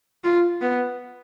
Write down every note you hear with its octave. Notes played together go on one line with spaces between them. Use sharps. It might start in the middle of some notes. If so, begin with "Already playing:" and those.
F4
B3